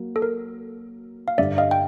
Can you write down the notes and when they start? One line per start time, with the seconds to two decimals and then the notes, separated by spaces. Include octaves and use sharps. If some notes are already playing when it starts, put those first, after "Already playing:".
Already playing: F#3 A#3
0.16 A4
0.22 A#4
1.28 F5
1.38 G2 D3 G3 D5 E5
1.58 D#5 F5
1.71 G5